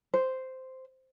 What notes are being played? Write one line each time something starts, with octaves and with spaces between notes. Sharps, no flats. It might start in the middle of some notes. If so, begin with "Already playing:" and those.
C5